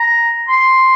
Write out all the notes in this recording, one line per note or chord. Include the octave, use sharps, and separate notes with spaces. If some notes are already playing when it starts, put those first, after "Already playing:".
Already playing: A#5
C6